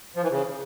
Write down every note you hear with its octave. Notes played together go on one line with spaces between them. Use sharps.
F3
E3
C#3